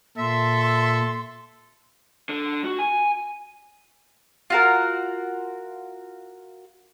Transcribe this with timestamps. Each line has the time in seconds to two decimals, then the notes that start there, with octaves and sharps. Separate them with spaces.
0.18 A#2 A4 E5 C6
2.29 D3
2.65 F#4
2.79 G#5
4.50 F4 F#4 A#4